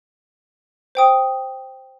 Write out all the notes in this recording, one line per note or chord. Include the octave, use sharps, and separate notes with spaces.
C5 G5 D#6